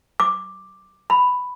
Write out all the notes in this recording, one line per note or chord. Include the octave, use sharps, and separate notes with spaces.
D6
B5